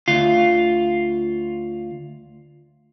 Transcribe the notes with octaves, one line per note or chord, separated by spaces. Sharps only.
D2 F4